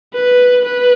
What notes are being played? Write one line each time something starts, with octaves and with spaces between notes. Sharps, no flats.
B4
B4